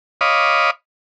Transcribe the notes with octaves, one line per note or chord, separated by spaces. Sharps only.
C#5 D#5 F5 B5 D6 D#6